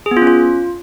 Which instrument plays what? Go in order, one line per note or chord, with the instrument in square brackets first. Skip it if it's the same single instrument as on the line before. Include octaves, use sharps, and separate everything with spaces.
[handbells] G#4
B3
F4
C#4
F4